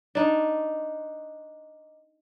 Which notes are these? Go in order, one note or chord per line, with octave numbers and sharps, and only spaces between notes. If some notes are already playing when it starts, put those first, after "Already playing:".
D4 D#4